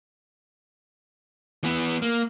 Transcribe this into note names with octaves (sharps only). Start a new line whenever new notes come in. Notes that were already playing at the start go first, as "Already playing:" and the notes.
E3 B3
A#3